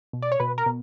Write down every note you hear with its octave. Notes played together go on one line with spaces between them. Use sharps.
B2
D5
C#5
B2 B4
A#4
B2